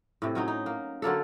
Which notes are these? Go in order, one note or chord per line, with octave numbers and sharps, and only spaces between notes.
A2 C3
F#3 C#4 D#4
D#4
A#3
D3 F#3 A#3 A4